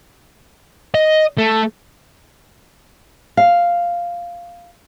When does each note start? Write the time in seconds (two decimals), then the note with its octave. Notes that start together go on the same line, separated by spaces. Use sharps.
0.95 D#5
1.38 A3
3.37 F5